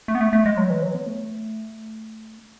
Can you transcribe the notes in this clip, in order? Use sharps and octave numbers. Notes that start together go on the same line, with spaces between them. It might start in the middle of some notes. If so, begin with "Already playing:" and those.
A3
B3
A3
A3
G#3
F#3
E3
F#3
B3
A3